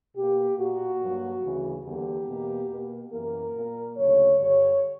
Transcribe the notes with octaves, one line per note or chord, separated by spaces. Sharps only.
B2 A#3 G4
A#2 A#3 F#4
G2 F#3 A#3
D2 C#3 E3
E2 D3 G3 A#3 G4
E2 B2 A#3
B2 A#3
F#2 E3 A#3 A#4
A#2 A#3
D2 C#3 F#3 C#5
G2 D3 G3 C#5